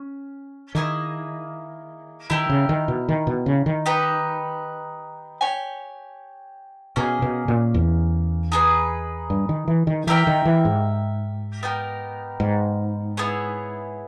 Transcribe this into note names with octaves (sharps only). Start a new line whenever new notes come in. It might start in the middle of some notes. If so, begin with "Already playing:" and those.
Already playing: C#4
D#3 A#3 E4 G#4 D#5
D#3 E4 G4 A#4
C#3
D#3
B2
D#3
B2
C#3
D#3
D#4 G4 B4
G4 C#5 G#5
B2 A#3 C#4 G#4 D#5
B2
A#2
E2
D#4 G#4 B4
G2
D#3
E3
D#3
E3 G4 A#4 E5 G5
D#3
E3
G#2
B3 D#4 G4 A#4
G#2
B3 E4 G#4 C#5